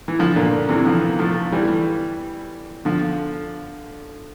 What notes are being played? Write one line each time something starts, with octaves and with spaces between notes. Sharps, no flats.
E3
D3 F3
A#2 D3
C3 E3
D3 F3
F3 A3
E3 G3
D3 F3